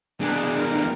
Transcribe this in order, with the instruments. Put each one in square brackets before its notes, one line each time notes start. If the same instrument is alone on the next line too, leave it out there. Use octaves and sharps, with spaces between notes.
[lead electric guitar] E2 D4 [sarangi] G#4
[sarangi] A#4